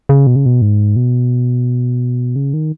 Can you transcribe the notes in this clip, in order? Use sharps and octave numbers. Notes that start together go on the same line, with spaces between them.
C#3
B2
C#3
B2
G#2
B2
C#3
D#3